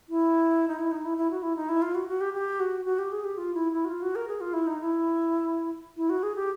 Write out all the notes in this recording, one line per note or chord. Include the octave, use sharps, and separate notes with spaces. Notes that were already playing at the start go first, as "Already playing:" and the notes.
E4
D#4
E4
D#4
E4
E4
F#4
E4
D#4
E4
F4
F#4
F#4
G4
G4
F#4
F#4
G4
G#4
G4
F4
E4
E4
F#4
F4
F#4
A#4
G#4
F4
E4
D#4
E4
E4
F#4
G#4
G4